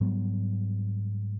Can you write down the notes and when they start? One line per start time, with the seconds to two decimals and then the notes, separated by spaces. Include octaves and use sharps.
0.01 G#2 F#3 G3 B3